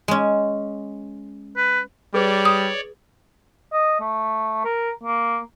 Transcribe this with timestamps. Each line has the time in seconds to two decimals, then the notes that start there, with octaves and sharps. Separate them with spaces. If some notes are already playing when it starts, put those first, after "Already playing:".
0.08 G#3 C#4
1.57 B4
2.14 G3 G#4 B4 C#5 D5
2.45 D#6
3.73 D#5
4.00 A3
4.65 A#4
5.04 A#3